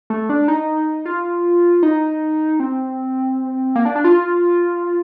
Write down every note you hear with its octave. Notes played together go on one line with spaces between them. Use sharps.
A3
D4
D#4
F4
D#4
C4
A#3
D4
D4
F4